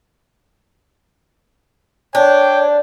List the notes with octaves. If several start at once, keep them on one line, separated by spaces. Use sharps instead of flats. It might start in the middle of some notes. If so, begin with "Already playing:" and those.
D4 C#5 G5